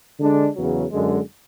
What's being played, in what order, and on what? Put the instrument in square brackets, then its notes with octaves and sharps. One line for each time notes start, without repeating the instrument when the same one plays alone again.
[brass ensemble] D3 G#3 D4
E2 C#3 F#3
F#2 D3 G#3